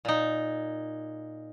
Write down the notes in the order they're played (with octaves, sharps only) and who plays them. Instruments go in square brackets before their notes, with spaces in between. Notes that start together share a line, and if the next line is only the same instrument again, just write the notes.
[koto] A#2 D#4